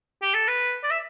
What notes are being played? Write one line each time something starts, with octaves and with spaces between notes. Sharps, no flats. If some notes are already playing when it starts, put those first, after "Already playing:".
G4
A4
B4
D5
E5